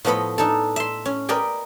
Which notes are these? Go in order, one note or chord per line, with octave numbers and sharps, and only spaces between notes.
A2 F3 B3 B4 D#5 B5
D4 D#4 A4
E5 C6
C#4
A#4 B4 D5 D#5 G5 G#5